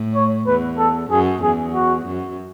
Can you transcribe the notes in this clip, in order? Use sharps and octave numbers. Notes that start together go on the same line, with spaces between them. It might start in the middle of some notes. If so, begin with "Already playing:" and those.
Already playing: A2
C#5
E2 B4
A4
F#2 G#4
E2 G#4
F#4
F#2